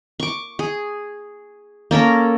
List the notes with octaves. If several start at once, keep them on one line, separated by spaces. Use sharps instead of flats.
C#6 D6
G#4
A#3 C#4 A4 A#4